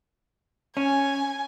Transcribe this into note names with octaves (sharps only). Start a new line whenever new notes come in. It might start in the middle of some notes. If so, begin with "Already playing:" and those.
C#4 G#5